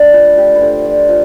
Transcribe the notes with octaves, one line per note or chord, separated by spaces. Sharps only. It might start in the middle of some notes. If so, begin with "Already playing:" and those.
Already playing: D3 A3 D4 D5
F3 B4
A3 G4
B4
D3 C5
F3 D5
F3 F5